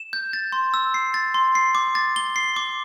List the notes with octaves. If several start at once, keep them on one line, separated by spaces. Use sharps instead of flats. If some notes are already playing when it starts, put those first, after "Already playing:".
Already playing: E7
G6
A6
C6
E6
C7
A6
C6
C7
D6
A6
G7
C7
D6